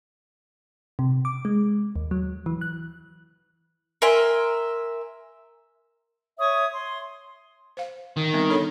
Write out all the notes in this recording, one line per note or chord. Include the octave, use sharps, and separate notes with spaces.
C3
D6
G#3
D#2
F#3
E3
F#6
A#4 E5 G#5 C6
C#5 E5 C#6 D#6
C6
C5 F5
D#3
G3 B3 C4
D4 A4 C#5